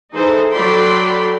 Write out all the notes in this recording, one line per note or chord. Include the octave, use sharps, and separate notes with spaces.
E3 D#4 G#4 A4 C5
F#3 A4 D5 G5 B5 C6